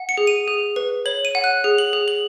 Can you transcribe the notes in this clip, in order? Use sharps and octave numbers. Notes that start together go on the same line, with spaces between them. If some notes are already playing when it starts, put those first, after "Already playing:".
Already playing: F#5
C#7
G#4
D#7
G#4
B4
C#5 F#7
D#7
F#5
F#6
G#4
F#7
G#4
F#7